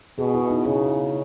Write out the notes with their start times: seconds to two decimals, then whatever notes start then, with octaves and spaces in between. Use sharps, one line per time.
0.19 B2 G#4
0.35 E4
0.51 D#4
0.65 C#3 E4